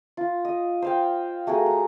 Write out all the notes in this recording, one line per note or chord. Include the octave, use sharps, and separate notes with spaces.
F4
D#5
C5 F5 G5
A3 F#4 G#4 A#4
A#5